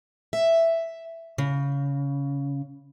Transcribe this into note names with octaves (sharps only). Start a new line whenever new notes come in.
E5
C#3